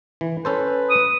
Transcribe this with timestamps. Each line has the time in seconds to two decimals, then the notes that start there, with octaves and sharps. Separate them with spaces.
0.21 E3
0.45 C#4 A4 B4 C5
0.90 D#6